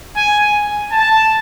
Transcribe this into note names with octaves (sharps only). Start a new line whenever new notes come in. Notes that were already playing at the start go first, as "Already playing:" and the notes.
G#5
A5